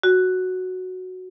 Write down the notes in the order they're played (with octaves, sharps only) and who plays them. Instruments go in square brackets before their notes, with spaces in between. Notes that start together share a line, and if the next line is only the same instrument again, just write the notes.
[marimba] F#4